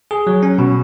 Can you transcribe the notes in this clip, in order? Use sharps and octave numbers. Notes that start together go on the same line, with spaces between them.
G#4
F#3
C#4
B2